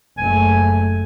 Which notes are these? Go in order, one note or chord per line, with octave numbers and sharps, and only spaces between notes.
F#1 A3 G#5